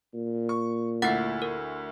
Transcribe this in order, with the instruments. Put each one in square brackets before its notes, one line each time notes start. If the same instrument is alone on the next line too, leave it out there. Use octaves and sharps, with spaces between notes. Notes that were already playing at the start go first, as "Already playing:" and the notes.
[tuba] A#2
[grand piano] C#6
[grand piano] D2 E4 C7 [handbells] A3 F#5 A6
[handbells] A#4